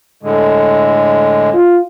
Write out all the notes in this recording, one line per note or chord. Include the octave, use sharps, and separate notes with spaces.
A2 D3 G#3
F4